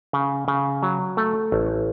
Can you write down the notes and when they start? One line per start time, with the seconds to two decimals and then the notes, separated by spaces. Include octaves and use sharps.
0.13 C#3
0.48 C#3
0.83 F#3
1.17 A3
1.52 A1